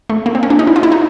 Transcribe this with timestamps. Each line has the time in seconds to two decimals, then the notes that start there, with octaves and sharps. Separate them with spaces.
0.10 A3
0.26 A#3
0.35 C4
0.43 C#4
0.50 D4
0.59 D#4
0.67 E4
0.76 F4
0.83 E4
0.92 D#4